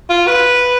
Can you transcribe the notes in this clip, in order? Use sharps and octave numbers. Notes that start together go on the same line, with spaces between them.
F4
B4